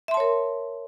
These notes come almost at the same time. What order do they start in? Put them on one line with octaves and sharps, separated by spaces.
E5 C6 A5 C#5 A#4